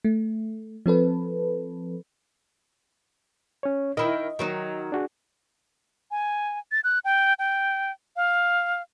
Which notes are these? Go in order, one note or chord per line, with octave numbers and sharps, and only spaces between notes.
A3
F3 C4 A4 B4
C#4 C#5
D#3 E4 D#5
D#3 F#3 D#4
D4 F#4 G#4
G#5
A6
F#6
G5
G5
F5